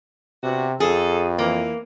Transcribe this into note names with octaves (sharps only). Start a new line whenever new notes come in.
C3 B3 D4 F#4
F2 G#4 A4
E3 A#3